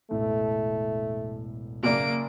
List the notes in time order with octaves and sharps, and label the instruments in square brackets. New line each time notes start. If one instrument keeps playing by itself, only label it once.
[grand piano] E1 A1 A2 [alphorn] A3
[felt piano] F#1 D5 [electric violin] A#3 D7